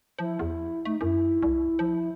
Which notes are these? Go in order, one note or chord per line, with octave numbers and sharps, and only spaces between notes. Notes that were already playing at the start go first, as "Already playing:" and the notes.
F3 E4
E2
A3 D#4
F#2 E4
C2
F3